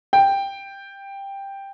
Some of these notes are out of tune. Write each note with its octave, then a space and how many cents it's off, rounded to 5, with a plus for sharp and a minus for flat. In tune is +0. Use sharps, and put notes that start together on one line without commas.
G5 +5